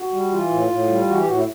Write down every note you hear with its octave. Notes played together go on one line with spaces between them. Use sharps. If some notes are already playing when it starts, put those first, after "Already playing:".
Already playing: F#4
G3
E3 F4
A2
A2
G3
E3 F#4
G4
A2 F#4
E4